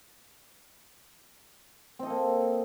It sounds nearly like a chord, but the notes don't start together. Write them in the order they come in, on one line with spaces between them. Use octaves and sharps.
C4 D#5 A4 A#3